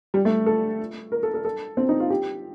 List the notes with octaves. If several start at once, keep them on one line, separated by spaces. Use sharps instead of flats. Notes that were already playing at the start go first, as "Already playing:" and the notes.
G3
A3
A4
A#4
A4
A4
A4
C4
D#4
F4
G4